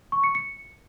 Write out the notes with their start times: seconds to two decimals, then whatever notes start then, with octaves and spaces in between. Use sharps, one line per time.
0.12 C#6
0.24 C#7
0.35 C#7